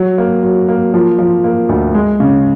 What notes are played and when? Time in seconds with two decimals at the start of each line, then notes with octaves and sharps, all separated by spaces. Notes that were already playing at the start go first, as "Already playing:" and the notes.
Already playing: F#3
0.18 A#3
0.43 F#3
0.69 A#3
0.94 F3
1.19 F3
1.44 A#3
1.69 D2
1.95 G#3
2.20 C#3